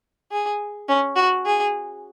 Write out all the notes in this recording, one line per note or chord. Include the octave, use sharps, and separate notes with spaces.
G#4
C#4
F#4
G#4